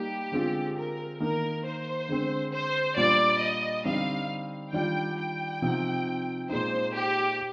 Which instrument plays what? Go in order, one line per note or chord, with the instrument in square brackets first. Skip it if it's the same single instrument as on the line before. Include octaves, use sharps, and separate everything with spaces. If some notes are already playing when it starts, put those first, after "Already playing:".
Already playing: [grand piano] G3 A#3 D#4 [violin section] G4
[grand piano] D3 G#3 C4 F4
[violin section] A#4
[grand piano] D#3 A#3 D#4 [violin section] A#4
[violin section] C5
[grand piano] D3 G#3 C4
[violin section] C5
[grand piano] A#2 G3 D4 F4 [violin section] D5
[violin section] D#5
[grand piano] D3 G3 C4 D#4 [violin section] F5
[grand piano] D#3 G3 D4 F4 [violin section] G5
[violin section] G5
[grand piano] C3 F3 C4 D#4
[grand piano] A#2 G#3 D#4 [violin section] C5
[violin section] G4